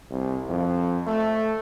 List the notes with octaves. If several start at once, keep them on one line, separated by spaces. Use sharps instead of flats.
C2
F2
A3